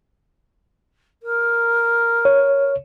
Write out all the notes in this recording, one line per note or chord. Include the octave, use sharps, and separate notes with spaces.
A#4
C#5